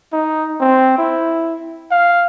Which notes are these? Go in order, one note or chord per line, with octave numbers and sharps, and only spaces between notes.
D#4
C4
E4
F5